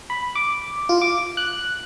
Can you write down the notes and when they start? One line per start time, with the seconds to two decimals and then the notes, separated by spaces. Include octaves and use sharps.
0.10 B5
0.35 D6
0.89 F4
1.01 D6
1.37 F#6